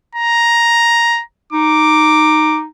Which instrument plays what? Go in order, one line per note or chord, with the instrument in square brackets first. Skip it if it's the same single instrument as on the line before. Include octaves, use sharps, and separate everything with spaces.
[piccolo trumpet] A#5
[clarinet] D#4 [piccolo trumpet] D6